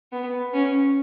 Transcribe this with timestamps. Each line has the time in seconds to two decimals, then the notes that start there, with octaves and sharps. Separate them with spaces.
0.12 B3
0.53 C#4